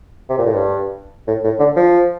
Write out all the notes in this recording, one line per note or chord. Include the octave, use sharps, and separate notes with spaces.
C3
A#2
A2
G2
A2
A2
D3
F3